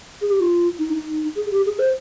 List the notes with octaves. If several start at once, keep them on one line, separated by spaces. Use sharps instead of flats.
G#4
G4
F4
D#4
D#4
G#4
G4
G#4
C5